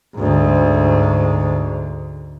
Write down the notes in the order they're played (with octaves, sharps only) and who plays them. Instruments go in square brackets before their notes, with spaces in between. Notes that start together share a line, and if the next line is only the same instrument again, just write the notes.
[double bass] D2 G#2